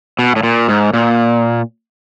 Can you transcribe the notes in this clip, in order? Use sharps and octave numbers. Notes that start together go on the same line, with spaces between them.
B2
A2
A#2
G#2
A#2